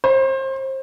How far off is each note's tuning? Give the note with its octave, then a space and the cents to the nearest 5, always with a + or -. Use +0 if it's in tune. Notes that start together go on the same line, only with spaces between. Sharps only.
C5 +30